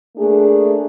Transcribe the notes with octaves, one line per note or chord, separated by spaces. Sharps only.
A3 A#3 D4 G#4